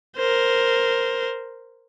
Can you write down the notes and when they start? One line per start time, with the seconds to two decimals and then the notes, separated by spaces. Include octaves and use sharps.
0.16 A#4 C5